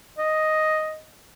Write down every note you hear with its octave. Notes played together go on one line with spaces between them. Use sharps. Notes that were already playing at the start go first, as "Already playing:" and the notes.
D#5